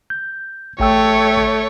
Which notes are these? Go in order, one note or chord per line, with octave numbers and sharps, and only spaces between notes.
G6
A1 A3 C#5 G5 E6